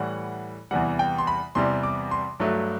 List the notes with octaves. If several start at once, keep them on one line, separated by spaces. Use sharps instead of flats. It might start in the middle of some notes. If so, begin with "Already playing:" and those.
Already playing: A2 E3 G3 F#5
E2 C3 E3 G3 F#5
G5
C6
B5
E2 C3 E3 G3 C6
D6
C6
G2 F#3 A3